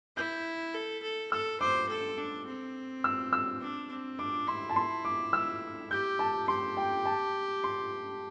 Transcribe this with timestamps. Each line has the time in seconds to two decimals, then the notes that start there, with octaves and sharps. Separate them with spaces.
0.17 E4 G6
0.74 A4
1.03 A4
1.32 A4 E6
1.61 C5 D6
1.89 A4
2.18 D4
2.46 C4
3.04 E6
3.33 E6
3.61 D4
3.90 C4
4.19 D4 D6
4.47 E4 C6
4.70 A5
4.76 C6
5.05 D6
5.33 E6
5.91 G4 G6
6.19 A5
6.48 G4 C6
6.77 G5
7.06 A5
7.64 C6